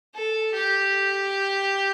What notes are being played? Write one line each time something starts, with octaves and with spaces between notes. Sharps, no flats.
A4
G4